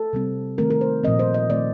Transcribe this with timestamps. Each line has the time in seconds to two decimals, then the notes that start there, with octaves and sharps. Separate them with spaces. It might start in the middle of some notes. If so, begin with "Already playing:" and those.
Already playing: A4
0.13 C3 G3 C4
0.58 D#3 A3 C4 A#4
0.70 A#4
0.81 C5
1.04 A#2 F3 A3 C4 D#5
1.19 C5
1.34 D#5
1.50 D#3 A3 C4 D5